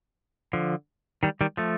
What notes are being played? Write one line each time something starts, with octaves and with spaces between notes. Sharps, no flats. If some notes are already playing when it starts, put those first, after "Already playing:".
D3 F3
D#3 G3
D#3 G3
F3 A3